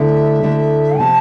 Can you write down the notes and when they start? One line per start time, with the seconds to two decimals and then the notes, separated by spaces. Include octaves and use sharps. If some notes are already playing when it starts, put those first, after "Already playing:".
Already playing: D2 D3 A3 E4 E5
0.42 D2 D3 A3 E4
0.99 C3 F3 C4 F4 A5